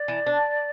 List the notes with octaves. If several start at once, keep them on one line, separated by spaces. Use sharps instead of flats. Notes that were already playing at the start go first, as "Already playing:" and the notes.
Already playing: D5
E3
D4